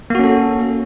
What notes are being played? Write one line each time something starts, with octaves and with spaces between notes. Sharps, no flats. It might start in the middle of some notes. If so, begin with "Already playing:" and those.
A#3 C#4 F#4 A4